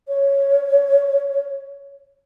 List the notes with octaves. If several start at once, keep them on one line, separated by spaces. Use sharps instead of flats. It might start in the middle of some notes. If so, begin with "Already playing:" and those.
C#5